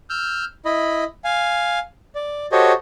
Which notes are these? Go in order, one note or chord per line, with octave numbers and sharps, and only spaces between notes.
E6 F6 G6
E4 D#5 B5
F5 G#5
D5
F#4 G4 A4 C5 C#5 D#5